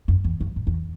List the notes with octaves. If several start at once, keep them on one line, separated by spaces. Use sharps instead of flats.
F#2
E2
F#2
G#2
E2